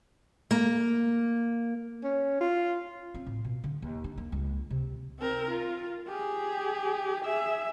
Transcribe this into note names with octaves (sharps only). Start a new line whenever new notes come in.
A#3
C#4
F4
C4
A2
B2
D3
D#2
D4
A#3
C#2
C3
C4 A#4
F4
G4 G#4
G#4 E5